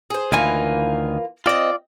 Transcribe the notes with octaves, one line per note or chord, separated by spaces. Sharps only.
G#4 C5
D2 D#3 E3 A#3 F4 G#5
C4 F4 D5 D#5